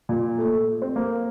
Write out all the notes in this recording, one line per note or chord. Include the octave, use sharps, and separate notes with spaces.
A#2
A3
C4
A#3